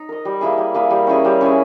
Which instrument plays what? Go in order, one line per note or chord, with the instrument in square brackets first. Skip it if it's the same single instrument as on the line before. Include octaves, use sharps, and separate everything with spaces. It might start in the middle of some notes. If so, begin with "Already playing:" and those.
Already playing: [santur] D#4
A#4 D#5
G3
A#3 E4 G#4
G3
A#3 E4 G#4
G3
C#4 E4 G#4
G3
C#4 E4 G#4